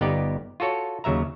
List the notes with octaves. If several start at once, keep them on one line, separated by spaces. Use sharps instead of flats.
G1 B3 D#4 G4 D5
F4 F#4 A4 C#5
D#2 C#3 F#3 E5 A#5